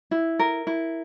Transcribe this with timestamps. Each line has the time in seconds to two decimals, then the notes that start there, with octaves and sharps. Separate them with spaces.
0.11 E4
0.39 A#4
0.67 E4